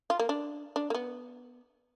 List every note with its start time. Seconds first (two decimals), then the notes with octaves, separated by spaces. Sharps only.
0.10 F4
0.19 A#3
0.29 D4
0.76 D4
0.90 A#3
0.94 B3